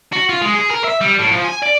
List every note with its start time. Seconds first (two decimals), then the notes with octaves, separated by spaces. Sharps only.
0.12 F#4
0.29 F4
0.42 G#3
0.55 G#4
0.71 A#4
0.84 E5
1.01 G3
1.19 A2
1.31 F3
1.45 G#5
1.63 D5